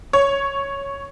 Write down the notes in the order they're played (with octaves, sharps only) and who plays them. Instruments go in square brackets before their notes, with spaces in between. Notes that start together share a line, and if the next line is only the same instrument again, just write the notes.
[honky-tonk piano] C#5